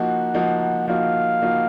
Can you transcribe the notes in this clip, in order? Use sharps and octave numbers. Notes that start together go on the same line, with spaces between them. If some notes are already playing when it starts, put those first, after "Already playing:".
Already playing: F3 A#3 D#4 F#4 F#5
F3 A#3 D#4 F#4
F3 A#3 D#4 F#4 F5
F3 A#3 D#4 F#4